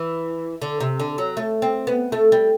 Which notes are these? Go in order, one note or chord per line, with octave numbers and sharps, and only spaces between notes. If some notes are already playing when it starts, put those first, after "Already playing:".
Already playing: E3
D3
C3
D3
F#3
A3
C4
B3
A3
G3